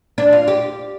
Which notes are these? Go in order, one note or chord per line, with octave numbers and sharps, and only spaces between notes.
D4
F4
G4